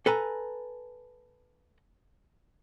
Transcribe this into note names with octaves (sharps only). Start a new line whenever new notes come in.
A4 B4 G#5 A#5